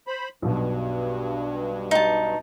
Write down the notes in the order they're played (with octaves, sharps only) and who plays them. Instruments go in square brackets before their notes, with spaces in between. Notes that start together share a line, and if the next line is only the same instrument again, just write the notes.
[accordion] C5 B5
[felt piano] B1 B2 [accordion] G2
[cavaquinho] D#4 A5